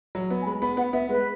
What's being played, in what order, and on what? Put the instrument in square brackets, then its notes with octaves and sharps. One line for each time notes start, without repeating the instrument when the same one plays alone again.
[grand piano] F#3
B3
[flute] G#5
[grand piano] G#3 [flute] B5
[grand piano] B3 [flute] B5
[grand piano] B3 [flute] F#5
[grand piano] B3 [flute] E5
[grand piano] G#3 [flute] B4